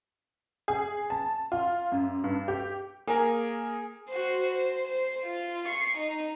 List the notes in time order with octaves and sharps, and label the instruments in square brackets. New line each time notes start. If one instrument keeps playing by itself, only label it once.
[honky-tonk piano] G#4
A5
F4
F#2
G2
G4
[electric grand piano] A#3 A#4 [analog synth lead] G#4 [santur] G#5
[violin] F#4 C5
C5
C5
F4
C#6 C7
D#4